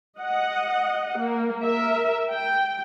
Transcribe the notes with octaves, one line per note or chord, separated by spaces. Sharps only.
D#5 F#5
A#3
A#4 E5
G5